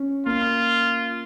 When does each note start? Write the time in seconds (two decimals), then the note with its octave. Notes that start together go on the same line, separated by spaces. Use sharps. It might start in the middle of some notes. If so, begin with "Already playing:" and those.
Already playing: C#4
0.26 A#3 F4